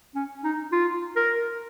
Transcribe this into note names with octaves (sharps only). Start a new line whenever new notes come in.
C#4
D#4
F4
A#4